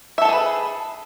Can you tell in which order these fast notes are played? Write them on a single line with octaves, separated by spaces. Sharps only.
E5 A4 A5 G#4 B4